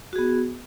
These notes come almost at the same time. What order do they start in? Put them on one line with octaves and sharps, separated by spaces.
F#4 G#4 B3